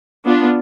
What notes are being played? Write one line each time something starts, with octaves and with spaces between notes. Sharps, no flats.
B3 D4 F4